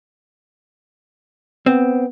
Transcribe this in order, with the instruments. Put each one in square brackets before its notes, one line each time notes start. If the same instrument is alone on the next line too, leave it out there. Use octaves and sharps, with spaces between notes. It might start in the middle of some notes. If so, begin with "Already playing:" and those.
[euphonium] B3 [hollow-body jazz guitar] C4